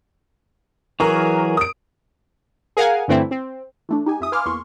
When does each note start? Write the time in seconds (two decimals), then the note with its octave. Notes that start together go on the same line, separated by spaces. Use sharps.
1.00 E3 F#3 G#4 A#4 A#5 C#6
1.57 D#6 D7
2.77 G#4 A#4 F5 F#5 G#5
3.08 G2 D3 E3 A3 C4 E4
3.31 C4
3.89 E3 A3 D4
4.06 D#4 G4 G#5
4.20 F2 E5 D#6
4.32 B4 F5 G#5 C6 D6 F6
4.46 E2 A#2 A#3 C6 C#6